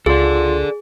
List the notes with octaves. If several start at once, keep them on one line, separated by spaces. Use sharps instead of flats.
C#2 F4 G#4 A4 D5 C6